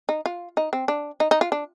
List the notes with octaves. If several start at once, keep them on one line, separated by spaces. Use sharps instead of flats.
D#4
F4
D#4
C4
D4
D#4
D#4
F4
D4